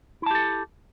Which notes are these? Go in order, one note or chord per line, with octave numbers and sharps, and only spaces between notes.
E4 G4 A4 A5